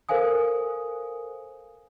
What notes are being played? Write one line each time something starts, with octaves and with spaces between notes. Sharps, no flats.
A4 A#4 C5 F5 G#5 D#6